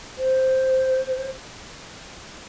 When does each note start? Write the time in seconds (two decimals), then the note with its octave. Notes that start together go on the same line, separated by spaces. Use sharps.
0.18 C5